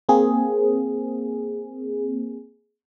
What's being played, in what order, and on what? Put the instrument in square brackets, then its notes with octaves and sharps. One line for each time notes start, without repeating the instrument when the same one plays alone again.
[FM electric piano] A#3 C4 G#4